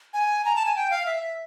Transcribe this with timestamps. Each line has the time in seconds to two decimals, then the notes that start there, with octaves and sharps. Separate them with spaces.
0.13 G#5
0.45 A#5
0.56 A5
0.66 G#5
0.76 G5
0.90 F5
1.06 E5